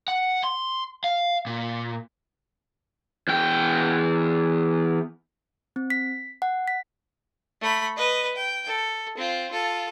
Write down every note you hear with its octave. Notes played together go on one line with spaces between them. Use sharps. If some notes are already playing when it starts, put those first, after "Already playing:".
F#5
C6
F5
A#2
E2 G5
C4
B6
F#5
B6
A3 B5
B4 D#5
G5
A4
C4 F4
F4 A4